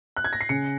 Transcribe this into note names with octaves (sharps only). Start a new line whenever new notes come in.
F#6
G#6
A#6
C7
C#3 C#7